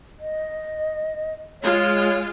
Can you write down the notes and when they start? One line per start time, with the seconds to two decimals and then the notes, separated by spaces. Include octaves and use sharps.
0.20 D#5
1.62 G#3 F4 C#5